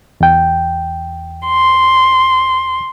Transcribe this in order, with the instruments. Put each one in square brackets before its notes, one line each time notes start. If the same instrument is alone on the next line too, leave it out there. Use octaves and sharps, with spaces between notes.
[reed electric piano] E2 G5
[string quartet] C6